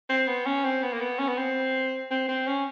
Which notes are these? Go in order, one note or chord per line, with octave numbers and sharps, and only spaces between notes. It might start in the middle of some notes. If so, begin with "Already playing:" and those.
C4
B3
C#4
C4
B3
A#3
B3
C#4
B3
C4
C4
C4
C#4